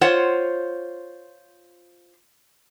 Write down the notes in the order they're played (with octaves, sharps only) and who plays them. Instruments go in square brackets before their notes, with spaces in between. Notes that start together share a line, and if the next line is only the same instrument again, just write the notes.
[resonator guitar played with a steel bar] F4 C5 C#5 F#5